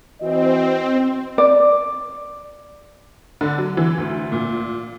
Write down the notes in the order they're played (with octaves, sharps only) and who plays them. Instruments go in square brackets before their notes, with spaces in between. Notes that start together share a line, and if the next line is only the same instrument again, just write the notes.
[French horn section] E3 F#4 D#5 [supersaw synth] C4
[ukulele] D5
[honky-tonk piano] D3
F#3
E3
D2
A#2